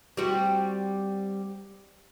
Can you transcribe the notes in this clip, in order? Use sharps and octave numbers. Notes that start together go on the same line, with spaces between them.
G3 C4 F#4